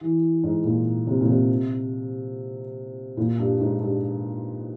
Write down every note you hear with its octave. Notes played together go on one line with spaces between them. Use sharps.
E3
G#2
A#2
C3
A#2
C3
A#2
G2
G#2
G2